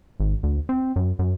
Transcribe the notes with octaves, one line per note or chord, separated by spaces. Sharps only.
G#1
D2
C4
F#2
F#2